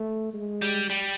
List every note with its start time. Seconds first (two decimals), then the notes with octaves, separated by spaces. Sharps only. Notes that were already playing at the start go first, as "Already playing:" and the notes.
Already playing: A3
0.34 G#3
0.62 G3
0.90 G3